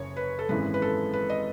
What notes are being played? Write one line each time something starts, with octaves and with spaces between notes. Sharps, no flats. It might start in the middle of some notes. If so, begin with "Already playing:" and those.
Already playing: F#1 F#2 C#5
B4
A4
G#1 F#2 E3 G#3 B4
B4
A4
B4
D#5